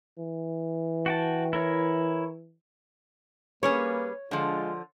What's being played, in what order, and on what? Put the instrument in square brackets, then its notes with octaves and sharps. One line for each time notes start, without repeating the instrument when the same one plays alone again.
[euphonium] E3
[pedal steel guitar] F#4 G5 A5
E4 A#4 C#5
[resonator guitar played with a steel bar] G3 C#4 G#4 [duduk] A#3 [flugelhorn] B4 [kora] C#5
[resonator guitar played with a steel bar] D3 F3 [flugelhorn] G#3 [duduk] F4